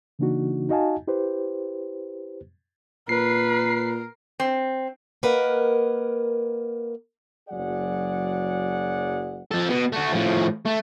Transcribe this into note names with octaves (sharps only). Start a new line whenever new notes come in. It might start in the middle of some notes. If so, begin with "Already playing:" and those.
C#3 E3 A#3 D4 D#4 F#4
D#4 F#4 D#5 F5 G#5 A5
E4 G4 B4 C5
A#2 A#4 B4 C7
C4
A#3 A#4 B4 D#5 F#5
F#1 F#3 G#4 D5 F#5
F3 A4
B2
A3 F#4
A2 F3
A3